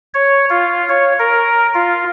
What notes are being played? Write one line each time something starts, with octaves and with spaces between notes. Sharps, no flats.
C#5
F4
C#5
A#4
F4